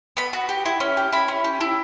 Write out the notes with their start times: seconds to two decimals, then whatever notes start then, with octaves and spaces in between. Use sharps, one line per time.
0.17 B3 B5
0.33 F#4
0.49 G4
0.66 E4
0.80 C#4
0.97 G4
1.13 E4 B5
1.28 C#4
1.44 G4
1.61 E4